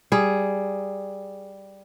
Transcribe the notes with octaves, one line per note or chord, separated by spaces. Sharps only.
G3 G#4